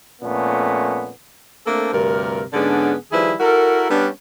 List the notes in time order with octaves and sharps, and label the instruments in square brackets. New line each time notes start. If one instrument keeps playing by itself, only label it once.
[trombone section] F2 A#2 A3 B3 C#4
[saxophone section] A3 A#3 C4 D4 A4
D2 G2 C3 A#4
G#2 D3 B3 C#4 D4 G#4
D#3 F3 G3 E4 G#4 B4
E4 F#4 A4 A#4
G3 B3 C#4 D4